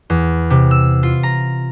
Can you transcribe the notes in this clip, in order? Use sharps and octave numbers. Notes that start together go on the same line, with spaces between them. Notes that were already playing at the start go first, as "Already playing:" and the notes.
E2
C3
E6
F4
A#5